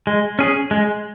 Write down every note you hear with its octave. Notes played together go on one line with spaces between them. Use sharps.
G#3
C#4 G#4
G#3